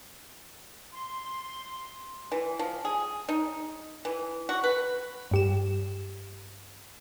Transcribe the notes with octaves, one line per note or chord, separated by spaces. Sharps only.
C6
E3
F3
G#4
D#4
E3
F#4
B4
G2 G4 E7